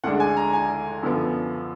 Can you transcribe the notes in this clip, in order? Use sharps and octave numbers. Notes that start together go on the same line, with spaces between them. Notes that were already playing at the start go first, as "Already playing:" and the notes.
D2 D3 G#3 D4 F#5
G#5
A#5
G#5
F#2 D3 F3 B3